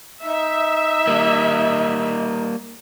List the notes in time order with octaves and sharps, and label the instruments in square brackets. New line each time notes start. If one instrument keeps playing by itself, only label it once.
[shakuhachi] D#4 [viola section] E5
[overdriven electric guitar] G3 A#3